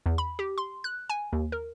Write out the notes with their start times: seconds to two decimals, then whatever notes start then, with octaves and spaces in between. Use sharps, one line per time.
0.06 E2
0.18 B5
0.39 G4
0.58 C6
0.84 F#6
1.10 G#5
1.33 D#2
1.52 A#4